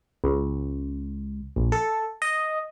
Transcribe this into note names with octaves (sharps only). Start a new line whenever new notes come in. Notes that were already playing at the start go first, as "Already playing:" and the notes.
C#2
A#1
A4
D#5